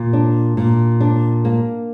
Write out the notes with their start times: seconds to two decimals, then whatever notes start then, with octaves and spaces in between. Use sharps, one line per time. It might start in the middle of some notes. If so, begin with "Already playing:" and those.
Already playing: A#2
0.13 D4
0.57 A#2
1.00 D4
1.45 A#3